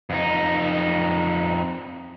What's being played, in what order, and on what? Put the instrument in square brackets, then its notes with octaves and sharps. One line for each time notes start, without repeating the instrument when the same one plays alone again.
[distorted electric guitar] F2 D#4